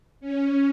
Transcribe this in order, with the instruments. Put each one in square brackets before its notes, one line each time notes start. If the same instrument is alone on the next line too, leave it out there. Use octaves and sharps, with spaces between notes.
[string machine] C#4